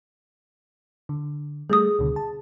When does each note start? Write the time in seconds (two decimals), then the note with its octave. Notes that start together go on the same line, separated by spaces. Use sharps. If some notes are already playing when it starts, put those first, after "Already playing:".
1.09 D3
1.70 G3 A3 G#4 D#6
1.99 C#2 B2 D3
2.16 A5